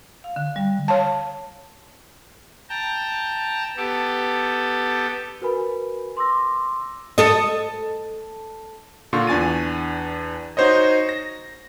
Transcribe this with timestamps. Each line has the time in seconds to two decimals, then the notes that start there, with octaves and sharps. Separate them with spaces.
0.24 F5
0.36 D3
0.56 G3
0.88 C#5 F5 A5
2.69 G5 A5 A#5
3.77 B3 G4 A4
5.42 F#4 A#4 B4 G#5 B5
6.17 C6 D6 E6 A#6
7.18 A4 D#5
9.13 A#2 D3 F4 C#6
9.27 E2 D4 G#5 A6 D#7
10.57 D#4 F#4 C5 C#5 D#5
11.09 A#6